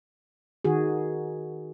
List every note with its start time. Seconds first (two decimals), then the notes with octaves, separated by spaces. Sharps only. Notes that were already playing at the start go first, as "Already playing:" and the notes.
0.65 D#3 F#4 G#4